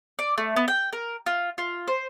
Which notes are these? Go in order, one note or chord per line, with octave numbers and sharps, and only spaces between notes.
D5
A3
B3
G5
A#4
F4
F4
C5